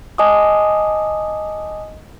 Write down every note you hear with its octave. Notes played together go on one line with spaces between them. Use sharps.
D#5 G#5 A5 D6 D#6